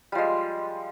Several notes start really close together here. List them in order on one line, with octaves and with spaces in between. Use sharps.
G3 F3 G#3